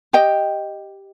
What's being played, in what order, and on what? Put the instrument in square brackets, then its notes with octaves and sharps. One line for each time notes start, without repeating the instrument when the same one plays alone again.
[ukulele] G4 D#5 G5